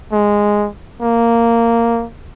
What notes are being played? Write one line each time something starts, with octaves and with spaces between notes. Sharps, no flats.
G#3
A#3